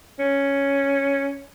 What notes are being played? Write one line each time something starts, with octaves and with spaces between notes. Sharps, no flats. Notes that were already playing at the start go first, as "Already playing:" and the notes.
C#4